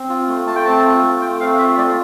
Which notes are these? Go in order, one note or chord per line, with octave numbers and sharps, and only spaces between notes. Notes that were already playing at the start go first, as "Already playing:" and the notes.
Already playing: C4
F4
A3
A3 A5
G5
C4 A5
F4
A3
A3 G5
C4 F5
F4 E5
A3 D5